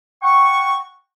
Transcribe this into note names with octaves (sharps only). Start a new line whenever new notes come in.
F#5 G5 C#6